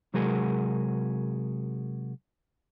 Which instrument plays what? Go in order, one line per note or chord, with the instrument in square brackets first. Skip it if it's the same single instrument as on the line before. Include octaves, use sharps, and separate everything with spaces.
[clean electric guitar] C3 F#3 G#3 F#4 G#4 A#4